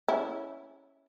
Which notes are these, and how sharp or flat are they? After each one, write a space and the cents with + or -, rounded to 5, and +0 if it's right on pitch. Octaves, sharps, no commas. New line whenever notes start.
C#4 +0 E4 +0